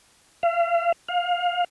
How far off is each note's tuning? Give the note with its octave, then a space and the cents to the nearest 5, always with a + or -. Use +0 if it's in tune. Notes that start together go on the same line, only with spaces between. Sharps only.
F5 -40
F5 +20